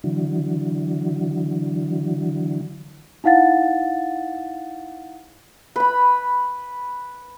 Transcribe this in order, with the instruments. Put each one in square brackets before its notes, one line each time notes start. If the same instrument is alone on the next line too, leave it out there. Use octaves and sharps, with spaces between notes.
[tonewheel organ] D3 E3 F#3
[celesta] D#4 E4 F5 F#5 A6
[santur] B4 B5